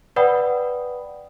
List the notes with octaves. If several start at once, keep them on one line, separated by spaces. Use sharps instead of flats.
B4 D5 F#5 G5 B5 D#6